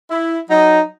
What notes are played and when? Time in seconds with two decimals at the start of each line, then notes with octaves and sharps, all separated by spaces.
0.10 E4
0.50 F#3 D#4